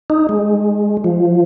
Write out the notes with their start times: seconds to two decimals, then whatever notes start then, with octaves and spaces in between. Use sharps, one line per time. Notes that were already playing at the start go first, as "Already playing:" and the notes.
0.10 D#4
0.29 G#3
1.04 F3